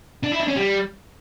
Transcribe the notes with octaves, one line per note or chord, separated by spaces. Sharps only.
D4
E4
D4
C#4
G3